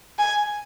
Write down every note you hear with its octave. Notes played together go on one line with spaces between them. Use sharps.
G#5